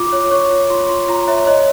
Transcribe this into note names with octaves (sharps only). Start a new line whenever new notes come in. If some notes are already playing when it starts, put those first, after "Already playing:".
Already playing: F4 D6
C#5
C#5 C#6
F4
F4 C6
F4 C6
F4 A#5
C#5 E5
C#5 D#5